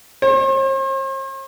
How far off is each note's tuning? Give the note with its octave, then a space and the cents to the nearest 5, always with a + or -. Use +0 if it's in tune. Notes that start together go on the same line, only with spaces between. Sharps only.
C5 +45